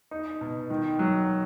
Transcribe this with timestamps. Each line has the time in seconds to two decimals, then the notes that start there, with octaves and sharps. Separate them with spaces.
0.11 D#4
0.41 B2
0.70 D#3
0.99 F#3